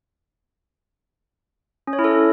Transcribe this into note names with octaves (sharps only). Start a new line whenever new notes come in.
C#4
C#5
E4
A4